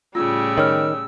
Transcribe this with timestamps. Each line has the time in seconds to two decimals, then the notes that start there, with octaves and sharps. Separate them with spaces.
0.15 A2 C#3 G3 F4 E6
0.58 D#3 C#5 F6